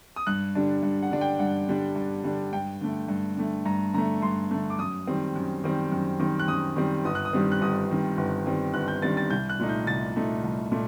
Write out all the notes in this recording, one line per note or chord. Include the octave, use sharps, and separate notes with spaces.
D#6
G2 F#6
D3 G3 D4
G2
F#5
D3 G3 D4
G5
G2 F#5
D3 G3 D4
G2
D3 G3 D4
G2 G5
D3 A3
G2
D3 A3
G2 A#5
D3 A3 A#5
G2 C6
D3 A3
D6
F#2 D#6
D#3 G3 C4
F#2
D#3 G3 C4
F#2
D#3 G3 C4
F#6
F#2 D#6
D#3 G3 C4
G1 D#6
F#6
D#6
G2 D#3 G3 C4
F#6
G1 D#6
G2 D#3 G3 C4
G1
G2 D#3 G3 C4
G1 F#6
G6
G2 D#3 G3 C4 A6
A6
C2 G6
F#6
A#2 A3 D#4
G6
C2 A6
A#2 A3 D#4
C2
A#2 A3